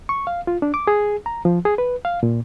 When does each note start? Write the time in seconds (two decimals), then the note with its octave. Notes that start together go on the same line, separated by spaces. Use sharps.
0.09 C#6
0.27 F5
0.47 F4
0.62 D4
0.74 D6
0.87 G#4
1.26 A#5
1.45 F3
1.65 G#4
1.78 B4
2.05 F5
2.23 A#2